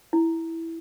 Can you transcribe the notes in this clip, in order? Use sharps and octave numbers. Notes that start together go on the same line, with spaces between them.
E4